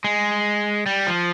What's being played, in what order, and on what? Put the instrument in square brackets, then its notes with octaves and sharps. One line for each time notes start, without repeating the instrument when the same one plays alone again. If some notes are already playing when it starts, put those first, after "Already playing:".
[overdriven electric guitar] G#3
G3
F3